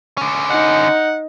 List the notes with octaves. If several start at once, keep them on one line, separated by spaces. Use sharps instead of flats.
D3 C#4
D#4 F#5